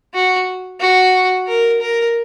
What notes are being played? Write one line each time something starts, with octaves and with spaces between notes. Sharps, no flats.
F#4
F#4
A#4
A#4